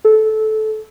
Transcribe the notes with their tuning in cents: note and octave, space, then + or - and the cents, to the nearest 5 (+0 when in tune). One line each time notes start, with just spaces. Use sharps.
A4 -20